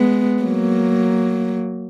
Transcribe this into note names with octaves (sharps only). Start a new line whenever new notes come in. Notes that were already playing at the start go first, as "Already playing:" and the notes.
Already playing: G#3 B3
F#3 A#3